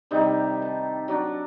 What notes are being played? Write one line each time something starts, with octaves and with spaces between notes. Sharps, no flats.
C3 D#3 G3 D#4
A5
F#3 D4